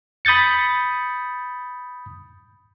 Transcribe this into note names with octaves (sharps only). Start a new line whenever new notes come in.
B5 D#6 G6 A6 C#7